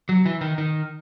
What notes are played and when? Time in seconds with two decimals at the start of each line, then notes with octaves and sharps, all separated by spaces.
0.09 F#3
0.25 E3
0.41 D#3
0.58 D#3